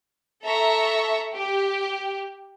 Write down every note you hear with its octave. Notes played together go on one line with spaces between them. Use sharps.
A4 E5 A#5 C#6
G4